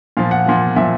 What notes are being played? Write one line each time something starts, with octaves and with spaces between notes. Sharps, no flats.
A#2 F3 F5
F#5
A#2 F3
A#2 F3 E5